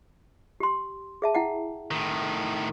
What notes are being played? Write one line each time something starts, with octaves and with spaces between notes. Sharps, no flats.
G4 C6
G#4 E5 A5
E4 F#5 G5
A2 D#3